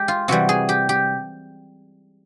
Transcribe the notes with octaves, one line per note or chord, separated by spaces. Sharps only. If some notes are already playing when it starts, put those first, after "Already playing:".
Already playing: G#3 G4
F4
C3 E3 G3 F#4
G#4
G4
G4